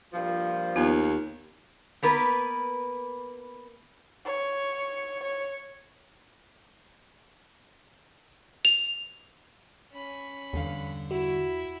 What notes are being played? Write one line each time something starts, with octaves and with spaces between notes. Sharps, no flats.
G2 A#2 F3
D#2 B3 F4
A#3 B3 A#4 B4
C#5
C#5
F7
C#4 B5
E2 G2 D3 F5
E4 F#4